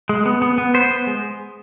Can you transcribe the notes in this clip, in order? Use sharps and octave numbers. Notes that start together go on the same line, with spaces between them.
G#3
B3
B3
B3
B3 C5
B3
G#3